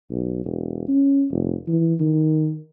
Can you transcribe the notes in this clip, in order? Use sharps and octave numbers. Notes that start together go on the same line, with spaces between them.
B1
E1
C#4
F1
E3
D#3